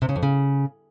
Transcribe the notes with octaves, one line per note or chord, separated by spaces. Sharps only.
C3
C#3
F2
C#3